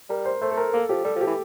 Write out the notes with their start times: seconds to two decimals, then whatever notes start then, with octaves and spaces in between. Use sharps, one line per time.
0.10 G3 A#4
0.25 C5
0.41 A3 C5
0.51 A4
0.57 A#4
0.73 A#3 A4
0.89 F3 G4
1.05 G3 A4
1.16 F3
1.21 G4
1.27 E3